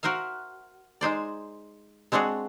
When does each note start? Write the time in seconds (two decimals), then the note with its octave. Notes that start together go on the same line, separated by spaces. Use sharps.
0.03 F#4 A#4 C5 E5 F5
1.01 G#3 D#4 C5 D5
2.12 G#3 C4 D4 F#4 G#4